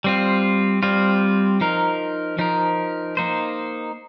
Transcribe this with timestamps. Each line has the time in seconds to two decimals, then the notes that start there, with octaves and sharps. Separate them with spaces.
0.04 G3 C4 F4
0.83 G3 C4 F4
1.61 F3 D#4 A#4
2.39 F3 D#4 A#4
3.17 A#3 D#4 C5